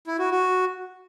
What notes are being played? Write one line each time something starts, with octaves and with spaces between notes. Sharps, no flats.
E4
F#4
F#4